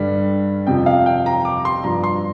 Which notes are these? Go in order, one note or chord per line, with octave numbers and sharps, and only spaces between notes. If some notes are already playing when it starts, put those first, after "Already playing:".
Already playing: G2 D3 G3
F2 C3 F3 G5
F5
G5
A#5
D6
C6
G2 F3 A#5
C6